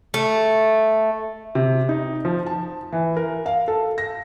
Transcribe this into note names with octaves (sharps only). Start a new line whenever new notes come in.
A3
C3
D#4
F3
A5
E3
A#4
F5
A4
A#6